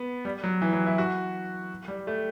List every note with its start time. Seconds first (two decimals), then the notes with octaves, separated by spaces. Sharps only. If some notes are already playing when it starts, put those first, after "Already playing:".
Already playing: B3
0.25 G3
0.44 F#3
0.62 E3
0.73 F#3
0.86 E4
0.98 F#4
1.88 G3
2.07 A3